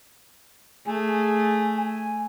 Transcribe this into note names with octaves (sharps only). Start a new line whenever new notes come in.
A3 G#4
G#5